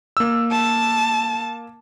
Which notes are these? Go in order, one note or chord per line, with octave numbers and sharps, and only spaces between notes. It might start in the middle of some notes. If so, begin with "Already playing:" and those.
A#3 E6
A5